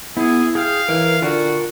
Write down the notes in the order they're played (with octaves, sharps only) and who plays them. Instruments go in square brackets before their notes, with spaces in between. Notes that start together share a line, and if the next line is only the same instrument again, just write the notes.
[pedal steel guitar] B3 [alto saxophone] E4 [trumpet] G#4
[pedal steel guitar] G#4 G5 F6 [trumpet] F5
[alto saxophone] E3 [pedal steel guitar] A#4 C#5
[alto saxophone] D3 [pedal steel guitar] F4 A#4 G#5 [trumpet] F#4